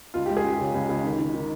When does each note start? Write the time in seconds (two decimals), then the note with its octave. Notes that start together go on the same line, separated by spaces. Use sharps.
0.14 C#2 F4
0.26 G#3 G4
0.37 G#4
0.44 C#2 G4
0.59 C#3
0.75 C#2
0.89 C#2
1.04 D#3
1.19 D#3
1.34 D#3